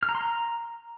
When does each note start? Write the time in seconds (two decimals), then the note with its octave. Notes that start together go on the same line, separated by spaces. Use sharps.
0.03 F6
0.09 A#5
0.15 C6
0.21 A#5